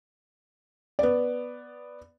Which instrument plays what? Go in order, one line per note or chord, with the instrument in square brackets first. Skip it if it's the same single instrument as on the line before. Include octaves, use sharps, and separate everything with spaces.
[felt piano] B3 D5